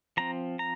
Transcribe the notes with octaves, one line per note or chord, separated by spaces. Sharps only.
F3 C4 A#5
A#5